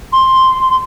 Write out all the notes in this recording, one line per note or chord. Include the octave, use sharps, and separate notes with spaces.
C6